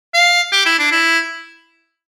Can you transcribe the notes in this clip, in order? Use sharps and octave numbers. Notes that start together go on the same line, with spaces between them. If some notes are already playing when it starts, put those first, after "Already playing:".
F5
G4
E4
D4
E4